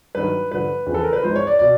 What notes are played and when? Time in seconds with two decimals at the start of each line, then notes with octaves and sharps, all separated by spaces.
0.15 G2 D#3 F#3 B4
0.51 G2 D3 F3 B4
0.87 E2 C#3 F3
0.94 A4
1.04 A#4
1.13 B4
1.23 G#2 F3 C5
1.36 C#5
1.47 D5
1.59 B2 D5